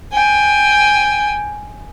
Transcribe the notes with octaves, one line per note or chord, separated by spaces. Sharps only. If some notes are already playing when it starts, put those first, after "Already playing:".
G5 G#5